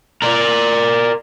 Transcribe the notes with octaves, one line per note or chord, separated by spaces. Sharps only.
A#4 D5